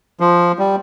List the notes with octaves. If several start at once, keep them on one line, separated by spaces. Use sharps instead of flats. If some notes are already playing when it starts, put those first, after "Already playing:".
F3
G3